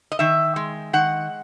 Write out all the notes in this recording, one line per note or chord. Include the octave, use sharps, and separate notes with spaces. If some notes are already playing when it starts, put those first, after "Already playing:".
D#5
D#3 E5
G#3
D#3 F#5